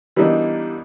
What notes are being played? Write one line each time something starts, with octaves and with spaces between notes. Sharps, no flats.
E3 G3 A#3 B3 D4 D#4